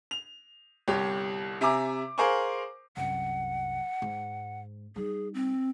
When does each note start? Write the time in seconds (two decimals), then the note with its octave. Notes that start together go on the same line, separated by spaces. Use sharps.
0.11 F7
0.88 G1 C2 G4 C#5
1.61 C3 E5 G#5 A#5 D6
2.18 G#4 A#4 C5 F5 G#5 C#6
2.97 C2 F#2 F#5
4.02 G#2
4.96 G3 D#4 G#4
5.34 C4